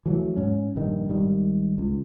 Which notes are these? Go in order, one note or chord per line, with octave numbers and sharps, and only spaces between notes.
E3 F#3 A3
G#2 C#4
A#1 G2 D#3
G#1 D#3 G3
C#2